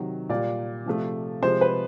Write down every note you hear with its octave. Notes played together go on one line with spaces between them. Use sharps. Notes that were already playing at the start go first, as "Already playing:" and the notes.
Already playing: C3 D#3 F#3
A#2 G3 D5
C3 F3 A3
C3 F3 G#3 C5
B4